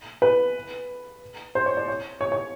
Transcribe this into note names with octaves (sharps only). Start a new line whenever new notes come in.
B4
C5
C#5
D5
C#5
C#5
C#5